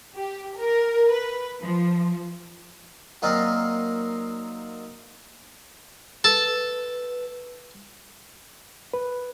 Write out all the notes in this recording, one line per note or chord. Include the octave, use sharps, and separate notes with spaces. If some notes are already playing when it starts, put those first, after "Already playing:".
G4
A#4
B4
F3
F#3 A#3 C4 D#4 D5 F5
A4 B4
B4